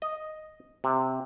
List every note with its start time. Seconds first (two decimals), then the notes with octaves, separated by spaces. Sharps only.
0.02 D#5
0.84 C3